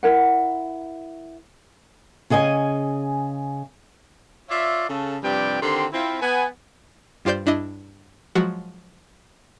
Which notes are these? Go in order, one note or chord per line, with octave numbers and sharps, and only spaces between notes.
E4 A#4 F#5
C#3 G#4 D#5 G5 G#5
F4 C#5 D5 E5
C#3 A4
G2 C3 F3 G3 D5 G5
D3 D#3 C4 G4 C6
C4 E4 F4
B3 G#5
G2 F4 G4 C5 D5 G6
G2 D4 E4 D#5
F3 F#3 G#3 F#4